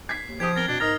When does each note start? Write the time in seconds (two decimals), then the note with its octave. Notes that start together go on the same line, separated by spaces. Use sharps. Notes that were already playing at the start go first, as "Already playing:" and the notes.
0.09 G#6 B6 C7
0.28 D#2
0.40 F3 G4 C5 D#6 G#6
0.56 C4 A#4 A6 G7
0.68 B2 D4
0.80 G#2 D#4 A#4 A#5 D#6 F6 A6